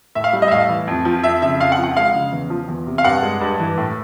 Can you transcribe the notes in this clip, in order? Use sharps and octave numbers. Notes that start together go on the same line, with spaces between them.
A2 E5
F5
G3
D#5
E5
A2 F5
E3
F2
F3
F2 E5
C#3 E5
F2 F5
F#5
F3
F#5
G#3 F5
C#3
E2
F3
E2
C3
F5
G2 F#5
G#3
G2
E3
A2